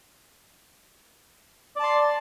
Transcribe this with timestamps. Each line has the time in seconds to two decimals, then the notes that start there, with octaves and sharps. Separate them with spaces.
1.76 D5
1.80 A5
1.83 C6